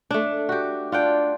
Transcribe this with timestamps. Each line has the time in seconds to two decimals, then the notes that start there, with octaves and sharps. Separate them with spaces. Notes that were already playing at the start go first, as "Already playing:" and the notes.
0.11 A3 D4
0.49 F#4 G4
0.92 D4 F4 F#5 G5